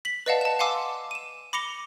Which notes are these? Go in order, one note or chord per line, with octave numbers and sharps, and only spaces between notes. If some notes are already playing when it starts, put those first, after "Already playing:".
B6 F#7
B4 D5 D#5 F5 F#5 A5
A5 E7
F5 F#5 G#5 C6 D6 E6
D#7 E7
B5 D6 A#6 C#7 F7 G7